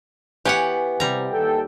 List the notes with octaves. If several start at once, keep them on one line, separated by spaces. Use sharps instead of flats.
E3 B3 G4 C#5 F#5 G#5
C3 G3 A#5
D#2 A4 G5